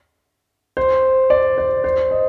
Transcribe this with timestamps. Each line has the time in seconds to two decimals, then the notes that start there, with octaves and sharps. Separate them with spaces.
0.77 C5
1.30 D5
1.58 C5
1.84 C5
2.11 D#5